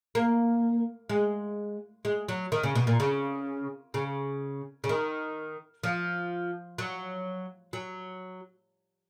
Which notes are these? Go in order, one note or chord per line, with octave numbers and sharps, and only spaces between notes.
A#3
G#3
G#3
F#3
D#3
C#3
B2
A#2
C#3
C#3
C#3
D#3
F3
F#3
F#3